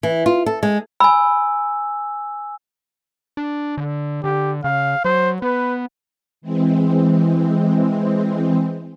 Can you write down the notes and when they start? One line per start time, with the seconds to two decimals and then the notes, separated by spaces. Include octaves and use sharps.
0.03 E3
0.26 F4
0.46 A4
0.63 G#3
1.00 G#5 B5 E6
3.37 D4
3.78 D3
4.24 D3 G4
4.64 C#3 F5
5.05 F#3 C5
5.42 B3 B4
6.42 E3 G#3 C4